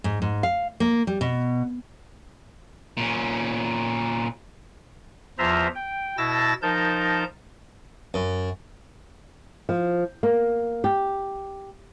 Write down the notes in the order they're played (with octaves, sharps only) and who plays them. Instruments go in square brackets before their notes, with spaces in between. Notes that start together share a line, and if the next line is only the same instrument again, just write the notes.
[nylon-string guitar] G#2
G#2
F5
A#3
G3
B2
[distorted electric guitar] A#2 C#4
[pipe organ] E2 F3 F4 C5 E5 A#5
G5
B2 E4 A5 E6 A6 A#6
F3 D#4 A#4 A5 G6
[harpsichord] F#2
[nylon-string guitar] F3
A#3
G4